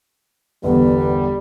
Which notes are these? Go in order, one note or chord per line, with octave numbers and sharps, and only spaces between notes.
G1 E2 G3 B4